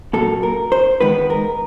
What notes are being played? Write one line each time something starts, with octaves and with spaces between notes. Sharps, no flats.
A#2 F#3 A#3 A4
A#4
C5
D#3 G#3 B3 B4
A#4